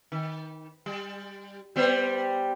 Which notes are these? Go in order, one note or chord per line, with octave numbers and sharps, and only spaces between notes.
D#3
G3
G3 B3 C5